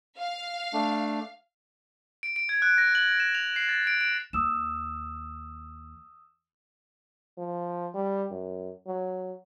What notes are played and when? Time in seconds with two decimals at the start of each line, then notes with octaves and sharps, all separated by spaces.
0.20 F5
0.73 A3 D4
2.23 D7
2.36 D7
2.49 G#6
2.62 F#6
2.78 A#6
2.95 F#7
3.20 E7
3.35 F7
3.56 C7
3.69 A6
3.87 D7
4.01 D7
4.33 D#2 D#6 E6 E7
7.38 F3
7.94 G3
8.31 F#2
8.87 F#3